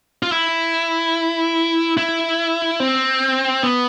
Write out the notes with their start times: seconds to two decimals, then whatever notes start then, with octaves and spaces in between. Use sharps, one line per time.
0.23 F4
0.32 E4
1.97 E4
2.80 C4
3.63 B3